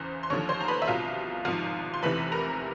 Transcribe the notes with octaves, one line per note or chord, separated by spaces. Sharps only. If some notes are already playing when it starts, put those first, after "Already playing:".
Already playing: E2 C#3 E3 C5
C6
D#2 D3 F3 C#5 C#6
C5 C6
A#5
B4 B5
E5
C2 B2 F4 F5
G#1 G#2 F3 F4 F5
C6
F1 E2 C3 E3 B4 B5
A#4 A#5